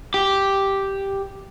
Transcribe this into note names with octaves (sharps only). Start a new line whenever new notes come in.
G4